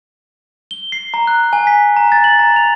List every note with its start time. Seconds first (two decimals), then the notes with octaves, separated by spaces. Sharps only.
0.71 G7
0.92 C7
1.14 A#5
1.27 F#6
1.53 G#5
1.67 B6
1.96 A#5
2.12 A6
2.24 F#7
2.39 A#5
2.56 F7